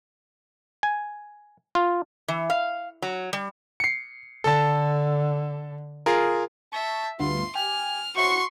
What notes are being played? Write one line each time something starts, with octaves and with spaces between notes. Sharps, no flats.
G#5
F4
E3
F5
F#3
G3
C7 C#7
D3 A4 A5
F4 G#4 A#4
E5 A5 C#6 G6 A#6
D2 G2 B3 F4 C6
G4 G#5 F6
C#4 E4 F#4 C5 C6 C#6